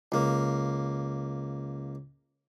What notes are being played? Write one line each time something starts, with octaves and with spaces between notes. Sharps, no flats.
C#2 A#3